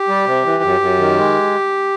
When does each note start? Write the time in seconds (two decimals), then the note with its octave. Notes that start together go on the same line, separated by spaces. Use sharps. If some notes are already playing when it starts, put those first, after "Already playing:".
Already playing: G4
0.08 G3
0.26 C3
0.45 E3
0.63 F#2
0.80 F#2
0.99 D#3
1.17 G#3